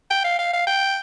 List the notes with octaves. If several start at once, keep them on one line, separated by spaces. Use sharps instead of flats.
G5
F5
F5
F5
G5